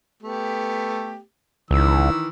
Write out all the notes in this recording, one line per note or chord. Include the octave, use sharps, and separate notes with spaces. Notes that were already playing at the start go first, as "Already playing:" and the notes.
A3 B3 G4
C#2 D#3 E3 E6